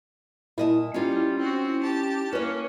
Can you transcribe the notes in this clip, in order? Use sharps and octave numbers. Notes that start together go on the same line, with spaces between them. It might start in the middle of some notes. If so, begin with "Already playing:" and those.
A#2 E4 D#5 A5
G3 C#4 D#4 F4
C4 F#4
G4 A5
A#3 C#4 B4 C#5